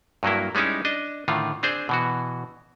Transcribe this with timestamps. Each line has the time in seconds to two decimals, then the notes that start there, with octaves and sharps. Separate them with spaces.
0.23 G2 F#3 A#3 E4
0.55 G3 G#3 C#4 D#4 E4
0.85 D4 D#5
1.28 A2 D3 D#3 F4
1.63 C4 D4 G#4 C5
1.89 B2 E3 F#4